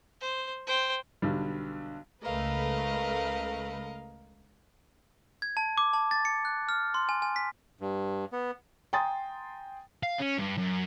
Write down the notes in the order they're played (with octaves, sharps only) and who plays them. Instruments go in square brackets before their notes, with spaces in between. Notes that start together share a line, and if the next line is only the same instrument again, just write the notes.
[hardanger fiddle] C5
C5 G5
[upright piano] B1 D3 G3
[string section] C#2 A3 B4 [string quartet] A#4 D#5 F5
[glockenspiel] G#6
A5
D6
A5
A6
C#7
F#6
F6
C6
G#5
G#5
B6
[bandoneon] G2
B3
[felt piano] G5 G#5 A#5 C6 D#6 A6
[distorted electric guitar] F5
C#4
G2
F#2